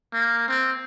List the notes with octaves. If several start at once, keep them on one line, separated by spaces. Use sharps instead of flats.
A#3
C4